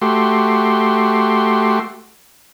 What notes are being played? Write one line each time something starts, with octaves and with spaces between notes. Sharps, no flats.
A3 F#4 G4 C6